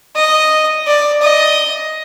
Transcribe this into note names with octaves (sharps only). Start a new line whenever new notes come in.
D#5
D5
D#5